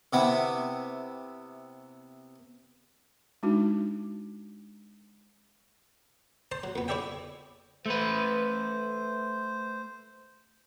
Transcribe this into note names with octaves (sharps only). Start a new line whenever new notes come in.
C3 B3 E4
G#3 D4 D#4 F#4
C5 A5 C6
F#3
F2 B3
E4 G#4 C#5 D5 E5 G5
A3 B4 C5